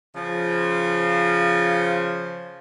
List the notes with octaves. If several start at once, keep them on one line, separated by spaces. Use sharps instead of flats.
C#3 F3